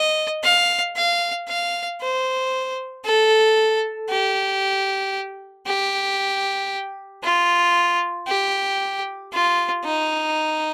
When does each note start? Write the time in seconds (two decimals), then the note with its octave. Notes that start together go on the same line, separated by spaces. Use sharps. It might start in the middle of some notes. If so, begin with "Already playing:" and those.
Already playing: D#5
0.43 F5
0.96 F5
1.48 F5
2.01 C5
3.05 A4
4.09 G4
5.67 G4
7.23 F4
8.27 G4
9.33 F4
9.85 D#4